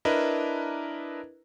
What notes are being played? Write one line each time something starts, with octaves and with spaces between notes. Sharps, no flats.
D4 E4 A#4 B4 D#5 A#5